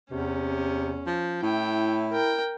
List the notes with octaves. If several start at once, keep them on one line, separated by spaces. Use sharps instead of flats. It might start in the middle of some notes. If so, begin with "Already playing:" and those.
E2 C3 C#4
F3
A2 E4 G5
A#4 G5